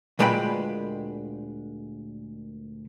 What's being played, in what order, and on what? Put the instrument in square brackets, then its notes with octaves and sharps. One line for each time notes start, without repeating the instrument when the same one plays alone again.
[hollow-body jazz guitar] D2 A#2 G#3 B4 G5 B5